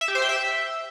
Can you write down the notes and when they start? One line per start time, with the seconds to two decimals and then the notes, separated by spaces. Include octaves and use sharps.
0.01 E5
0.08 G4
0.15 C5
0.22 G5
0.29 E5